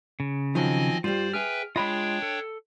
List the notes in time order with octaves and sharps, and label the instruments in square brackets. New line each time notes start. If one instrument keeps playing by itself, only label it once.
[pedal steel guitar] C#3
[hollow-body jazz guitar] D#3 F3 F#3 [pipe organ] C4 D#5 G#5
[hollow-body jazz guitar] G2 G3 [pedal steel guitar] F4 [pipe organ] C5 D5
[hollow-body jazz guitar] G#4 [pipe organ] B4 E5 G5 [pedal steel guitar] F6
[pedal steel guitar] G#3 F4 [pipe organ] D4 C#5 G5 [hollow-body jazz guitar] D#5 B5
[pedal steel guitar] A4